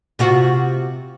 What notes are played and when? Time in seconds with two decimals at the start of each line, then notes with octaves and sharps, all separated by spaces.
0.19 C3 F4 F#4